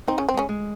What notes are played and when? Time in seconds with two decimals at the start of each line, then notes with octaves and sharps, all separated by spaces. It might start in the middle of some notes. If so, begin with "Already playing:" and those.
0.07 C4 D#4
0.18 C#3 C#4
0.29 C4
0.34 C#3 G#3 C#4
0.49 G#3